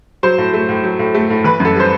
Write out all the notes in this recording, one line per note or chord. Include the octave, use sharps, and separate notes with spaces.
F#3 C5
A2
A3
A2
F#3
A2
A3
A2
E3 B4
F#2
A4
G3 C5